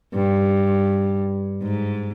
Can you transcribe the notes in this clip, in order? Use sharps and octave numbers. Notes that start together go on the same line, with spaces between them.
G2
G#2